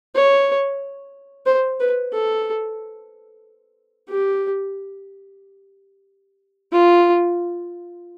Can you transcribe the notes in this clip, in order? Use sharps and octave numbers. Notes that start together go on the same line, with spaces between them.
C#5
C5
B4
A4
G4
F4